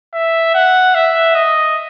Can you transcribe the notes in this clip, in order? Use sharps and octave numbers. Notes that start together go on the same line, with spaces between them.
E5
F#5
E5
D#5